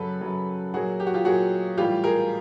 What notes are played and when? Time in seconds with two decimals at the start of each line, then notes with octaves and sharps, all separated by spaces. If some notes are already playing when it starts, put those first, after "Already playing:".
Already playing: F#2 C#3 F#3 A4 B4
0.21 F#2 C#3 F#3
0.74 A#2 F#3 F#4 G#4
1.00 G4
1.07 F#4
1.14 F4 G4
1.25 A#2 F#3 F#4 G#4
1.77 A2 E3 G3 F4 G4
2.04 G#4 A#4